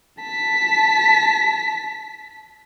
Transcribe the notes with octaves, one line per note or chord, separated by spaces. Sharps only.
A5 B6